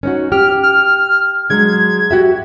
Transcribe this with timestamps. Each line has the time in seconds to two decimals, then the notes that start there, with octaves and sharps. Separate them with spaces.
0.03 C#4 D#4 F#4
0.32 G4 F6
0.63 F6
1.50 F#3 G#3 D4 G#6
2.11 F#4 G4 E5